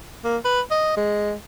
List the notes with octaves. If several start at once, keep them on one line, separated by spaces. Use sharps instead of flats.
A#3
B4
D#5
G#3